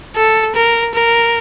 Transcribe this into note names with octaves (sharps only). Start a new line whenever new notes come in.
A4
A#4
A#4